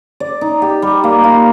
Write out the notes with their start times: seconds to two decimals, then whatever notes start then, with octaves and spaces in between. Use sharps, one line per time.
0.20 D5
0.41 D#4
0.62 G4
0.82 G3
1.04 A#3
1.24 F4